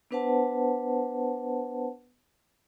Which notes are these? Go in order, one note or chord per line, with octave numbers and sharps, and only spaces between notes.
B3 D4 B4 C5 F#5 A5